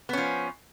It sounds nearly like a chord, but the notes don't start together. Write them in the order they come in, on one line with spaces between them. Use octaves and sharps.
B3 C#4 F3